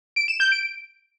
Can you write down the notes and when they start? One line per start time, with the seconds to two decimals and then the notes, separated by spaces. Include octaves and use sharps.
0.16 D7
0.28 E7
0.40 G6
0.52 D7